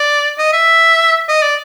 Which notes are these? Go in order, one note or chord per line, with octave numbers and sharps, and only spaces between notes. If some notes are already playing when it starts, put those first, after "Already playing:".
Already playing: D5
D#5
E5
D#5
D5